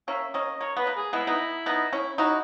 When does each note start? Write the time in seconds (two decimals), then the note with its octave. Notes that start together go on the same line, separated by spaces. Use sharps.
0.08 A#3 C#4 E5
0.34 A#3 C#4 D#5
0.60 A#3 C#5
0.77 B3 B4
0.87 A#3
0.97 G#4
1.13 G#3 B3 E4
1.27 B3 D#4
1.66 B3 D#4
1.93 C#4 E4
2.18 D#4 E4 F#4